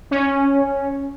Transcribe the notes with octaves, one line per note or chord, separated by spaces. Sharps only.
C#4